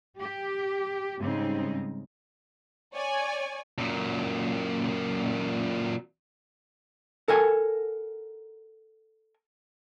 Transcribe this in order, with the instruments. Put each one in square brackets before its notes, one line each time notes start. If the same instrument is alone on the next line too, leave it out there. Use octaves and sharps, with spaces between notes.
[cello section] G4
G#2 C#3 G3 C4 D#4
[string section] C#5 D5 G#5
[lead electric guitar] F#2 A#2
[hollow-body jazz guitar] A4 A#4 F#5 G#5